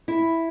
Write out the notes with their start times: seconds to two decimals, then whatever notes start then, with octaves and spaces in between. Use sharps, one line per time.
0.08 E4